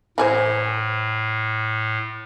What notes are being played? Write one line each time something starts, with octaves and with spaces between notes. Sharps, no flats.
A2 E3 G#4 C5